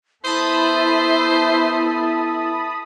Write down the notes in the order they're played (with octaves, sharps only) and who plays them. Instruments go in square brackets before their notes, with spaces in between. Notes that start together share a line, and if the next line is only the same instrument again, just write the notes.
[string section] B3 A4 E5 [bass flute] E4 [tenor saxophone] C5 [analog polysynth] A5 B5 D#6